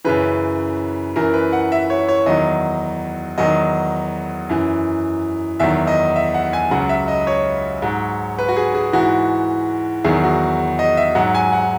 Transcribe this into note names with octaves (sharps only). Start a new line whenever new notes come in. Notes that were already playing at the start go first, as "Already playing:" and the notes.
F#2 C#3 E3 B4
F#2 E3 A#4
B4
F#5
E5
C#5
C#5
E2 D#3 F#3 D#5
E2 D#3 F#3 D#5
F#2 E3
E2 D#3 F#3 E5
D#5
E5
F#5
G#5
C#2 C#3 F#3 F#5
E5
D#5
C#5
G#2 F#3
B4
F#4
G#4
G#4
G#2 E3 F#4
E2 D#3 F#3 G#4
F#4
D#5
E5
G#2 F#3 F#5
G#5
F#5